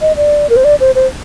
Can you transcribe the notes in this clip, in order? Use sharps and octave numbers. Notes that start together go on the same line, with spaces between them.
D#5
D5
A#4
C5
D5
C5
C5